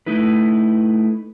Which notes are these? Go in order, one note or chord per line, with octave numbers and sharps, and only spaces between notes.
A3 D#4 E4 B4